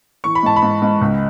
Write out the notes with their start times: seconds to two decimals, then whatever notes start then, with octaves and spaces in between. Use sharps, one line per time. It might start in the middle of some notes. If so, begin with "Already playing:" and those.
0.24 E3 C#6
0.35 B5
0.43 G#2 A5
0.56 B5
0.62 G#2
0.82 G#2
1.01 C#2